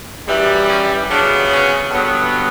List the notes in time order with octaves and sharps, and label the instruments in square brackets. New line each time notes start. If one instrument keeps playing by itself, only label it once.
[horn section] F#2 E3 G3
C#4
C#3 F#3 B3 D4
C#4
G2 D3 F#3 B3